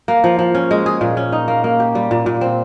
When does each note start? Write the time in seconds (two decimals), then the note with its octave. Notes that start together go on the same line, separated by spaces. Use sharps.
0.08 A#3
0.24 F3
0.39 F3
0.55 C#4
0.71 G#3
0.86 G#4
1.01 A#2
1.17 C#4
1.32 D#4
1.48 A#3
1.64 A#3
1.80 G4
1.95 G3
2.11 A#2
2.26 A#2
2.41 C4